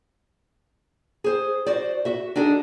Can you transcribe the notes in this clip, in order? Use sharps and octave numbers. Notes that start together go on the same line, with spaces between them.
G#4 C5
F#4 C5 D5
F#4 E5
D4 D#4 F#4 G#4 A4